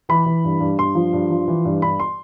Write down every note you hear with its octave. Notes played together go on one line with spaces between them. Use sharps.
E3 B5
E3
G2
G2
G2 C6
F3
G2
F3
E3
G2
G2 B5
C6